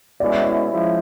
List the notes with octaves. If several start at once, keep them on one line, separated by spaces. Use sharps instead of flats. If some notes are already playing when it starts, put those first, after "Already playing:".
B2 G#3 C#4 E4 D5
F3 G#3 C#4 E4